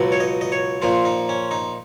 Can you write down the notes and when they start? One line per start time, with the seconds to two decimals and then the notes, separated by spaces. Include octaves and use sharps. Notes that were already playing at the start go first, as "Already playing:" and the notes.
Already playing: C#2 B2 F#3
0.12 C#5
0.20 D#5
0.41 D#5
0.52 C#5
0.82 A#2 F3 A#3 F4
1.05 D#4
1.29 C#4
1.51 D#4